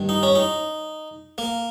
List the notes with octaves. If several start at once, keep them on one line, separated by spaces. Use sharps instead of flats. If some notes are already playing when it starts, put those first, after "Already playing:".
Already playing: G2 D#3
D#4
C#4
D#4
A#3